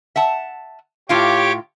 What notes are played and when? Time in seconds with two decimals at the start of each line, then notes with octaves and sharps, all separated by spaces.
0.16 E5 F#5 A5
1.09 A2 F4 G4 C#5 F5 D6